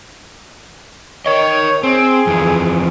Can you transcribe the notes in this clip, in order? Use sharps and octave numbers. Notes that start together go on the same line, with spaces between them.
A#4 C#5 D#5
C4 G#4
F2 E3